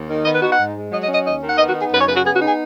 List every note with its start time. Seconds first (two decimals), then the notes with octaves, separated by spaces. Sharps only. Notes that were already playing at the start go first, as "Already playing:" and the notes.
Already playing: D#2
0.09 D#3
0.25 B3 D#5
0.34 B4
0.42 D#4 F#4
0.50 F#5
0.59 G#2
0.75 G#3
0.92 F#3 D#5
1.03 D#5
1.09 C#4
1.14 D#5
1.25 D#2 D#5
1.42 D#3
1.49 F#5
1.58 B3 D#5
1.69 F#4
1.75 D#4
1.80 G#4
1.91 F#2 B4
2.00 C#5
2.08 C#3 B4
2.16 F#4
2.24 B3 G#4
2.36 F#4
2.41 D#4
2.47 G#4